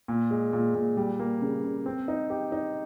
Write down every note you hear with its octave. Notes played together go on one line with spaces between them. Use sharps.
A#2
G#3
A#2
A#2
G3
A#3
C#3
C#3
C4
D#4
G4
D#4